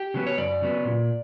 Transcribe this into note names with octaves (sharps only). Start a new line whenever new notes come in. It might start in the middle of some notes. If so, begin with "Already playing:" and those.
Already playing: G4
C#3 F#3 B3
C#5
F#2 D5
C#3 F#3 B3
A#2